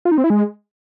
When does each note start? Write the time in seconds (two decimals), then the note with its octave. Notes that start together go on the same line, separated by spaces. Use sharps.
0.05 F4
0.12 D#4
0.18 C4
0.24 E4
0.30 G#3